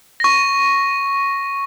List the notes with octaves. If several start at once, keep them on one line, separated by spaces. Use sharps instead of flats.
C#6 A#6